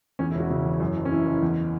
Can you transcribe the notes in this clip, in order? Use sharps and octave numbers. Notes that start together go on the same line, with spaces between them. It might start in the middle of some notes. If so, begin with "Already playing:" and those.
E2 C#4
E4
E1 F#4
C#3 E4
E3
F#2
F#1
C#4
E3 E4
F#1
E2